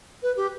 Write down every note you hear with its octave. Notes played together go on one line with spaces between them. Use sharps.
B4
G4